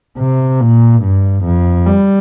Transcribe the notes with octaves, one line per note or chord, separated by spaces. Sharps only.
C3
A#2
G2
F2
G3